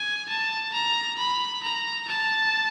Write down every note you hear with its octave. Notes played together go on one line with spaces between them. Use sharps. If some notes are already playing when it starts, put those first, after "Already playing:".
Already playing: G#5
A5
A#5
B5
A#5
A5